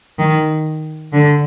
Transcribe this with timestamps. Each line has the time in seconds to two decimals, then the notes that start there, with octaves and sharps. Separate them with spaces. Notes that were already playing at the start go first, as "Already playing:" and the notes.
0.19 D#3
1.13 D3